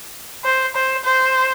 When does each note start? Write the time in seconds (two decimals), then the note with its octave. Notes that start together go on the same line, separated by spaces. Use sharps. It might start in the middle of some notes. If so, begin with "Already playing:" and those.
0.44 C5
0.75 C5
1.04 C5